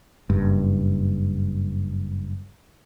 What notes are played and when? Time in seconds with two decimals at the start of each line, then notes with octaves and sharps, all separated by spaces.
0.30 F#1 G2